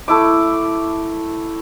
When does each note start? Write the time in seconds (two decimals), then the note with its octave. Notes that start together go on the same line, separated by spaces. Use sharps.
0.08 A3 E4 D6